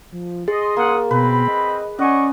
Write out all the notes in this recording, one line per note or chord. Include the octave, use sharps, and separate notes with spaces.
F3
G#4 D#5 C6
A#3 C#4 F#5 D#6
B2 C4 B4 B5
D#5
C#4 D5 D#5 F#5 G#5 C#6